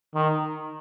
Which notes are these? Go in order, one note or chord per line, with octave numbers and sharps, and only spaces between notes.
D#3